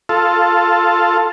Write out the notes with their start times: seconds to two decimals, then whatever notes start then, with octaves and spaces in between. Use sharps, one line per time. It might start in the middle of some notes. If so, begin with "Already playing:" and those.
0.09 F4 A4